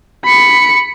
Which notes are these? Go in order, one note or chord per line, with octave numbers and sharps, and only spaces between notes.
B5 C#7